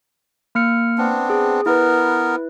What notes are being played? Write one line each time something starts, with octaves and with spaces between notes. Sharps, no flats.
A#3 F6 C#7
B3 C4 D4
G#4
B3 E4 A#4 B4